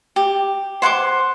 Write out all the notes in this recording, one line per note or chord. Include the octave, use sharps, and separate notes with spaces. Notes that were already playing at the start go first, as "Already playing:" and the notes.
G4
C5 F#5 C6 D6